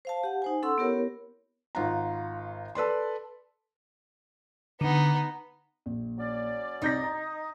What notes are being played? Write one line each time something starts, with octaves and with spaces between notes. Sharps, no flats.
C5 F5 A5
G4 F#5
D#4 C5 G#5
C#4 A4 F#5 C6 E6
B3 E4 G4 A#4 C#5
G#1 F4 F#5 A#5
A4 B4 D5 C6
D3 B3 D#4
A#1
F#3 C#4 D5
C2 D#4 G6 A#6
A#5